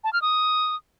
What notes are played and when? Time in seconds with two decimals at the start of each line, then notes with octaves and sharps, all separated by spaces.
0.04 A5
0.13 F6
0.22 D#6